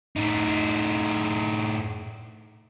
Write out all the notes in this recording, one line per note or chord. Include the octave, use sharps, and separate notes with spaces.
A2 D#4